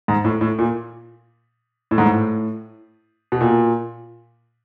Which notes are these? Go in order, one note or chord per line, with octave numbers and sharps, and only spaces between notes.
G#2
A2
A2
A#2
A2
G#2
A2
B2
A#2